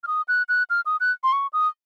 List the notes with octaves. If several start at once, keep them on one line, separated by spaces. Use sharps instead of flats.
F6
D#6
F#6
F#6
F6
D#6
F#6
C6
C#6
D#6